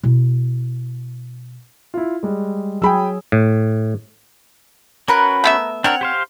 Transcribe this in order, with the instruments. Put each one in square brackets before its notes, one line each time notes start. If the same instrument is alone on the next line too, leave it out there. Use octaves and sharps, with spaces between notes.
[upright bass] B2 E4
[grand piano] E4 F4
G3 G#3
[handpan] F#3 G#4 [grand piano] G5 B5 E6
[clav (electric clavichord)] A2
[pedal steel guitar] C#4 F#4 B4 [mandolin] A#4 B5 F#6
[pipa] A3 B3 E5
[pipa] C4 [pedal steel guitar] D4 A#4 [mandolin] C#5 F#5
[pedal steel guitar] G4 C5 F5